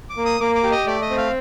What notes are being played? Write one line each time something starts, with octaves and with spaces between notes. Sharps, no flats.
D6
A#3
D#6
A#3 D6
D6
G4
D#5
A3 D5
D#5
C4
F5